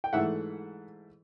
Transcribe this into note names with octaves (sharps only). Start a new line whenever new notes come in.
G5
G#2 E3 A3 E5 F#5